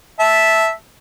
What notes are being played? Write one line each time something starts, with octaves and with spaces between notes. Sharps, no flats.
E5 A5